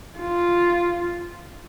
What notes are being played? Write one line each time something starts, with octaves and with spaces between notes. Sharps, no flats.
F4